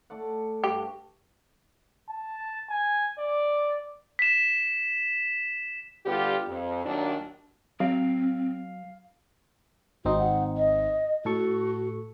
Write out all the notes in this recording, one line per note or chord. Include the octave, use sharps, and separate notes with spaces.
A3 D5 F#5
G2 F#4 G4
A5
G#5
D5
B6 E7
D3 G3 B3 F4 G4
F2
D#2 A#2 F#3 D4
F#3 C4 F5
G#1 C4 D#4 F#4
F#5
D#5
A2 F#4 A4 C#6